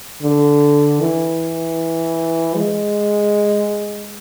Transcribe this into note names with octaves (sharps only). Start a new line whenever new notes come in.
D3
E3
G#3